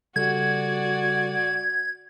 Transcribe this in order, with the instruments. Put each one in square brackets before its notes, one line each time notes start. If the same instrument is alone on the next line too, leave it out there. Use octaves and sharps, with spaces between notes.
[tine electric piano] C#3 G3 A4 [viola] F#4 D5 [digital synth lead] G#6